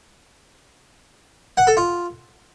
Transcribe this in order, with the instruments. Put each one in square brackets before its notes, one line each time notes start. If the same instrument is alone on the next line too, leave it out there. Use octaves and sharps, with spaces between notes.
[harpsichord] F#5
A4
F4